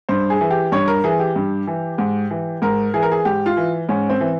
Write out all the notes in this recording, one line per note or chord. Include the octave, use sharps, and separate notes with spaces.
G2 C5
G#4
E3
G4
G2 C#5
A#4
E3 G#4
G4
G2
E3
G#2
E3
G#2 A#4
E3 G#4
A#4
G#4
G#2 G4
F4
E3
G#2 C#4
C4
E3